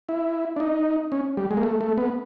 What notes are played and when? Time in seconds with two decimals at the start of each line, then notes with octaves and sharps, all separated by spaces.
0.09 E4
0.56 D4
0.60 D#4
1.12 C#4
1.37 G3
1.51 G#3
1.57 A#3
1.63 A3
1.81 A3
1.98 B3